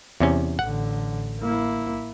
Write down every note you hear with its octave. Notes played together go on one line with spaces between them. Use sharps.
E2 C3 C#4
A1 D3 F#5
A#3 E4